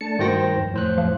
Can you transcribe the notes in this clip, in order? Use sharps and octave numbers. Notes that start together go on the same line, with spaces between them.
A3 D4 A5 C#7
G2 D#3 A3 F#4 C5 G5 A#6 C#7
F2
A2 C5 F#6
F3 F5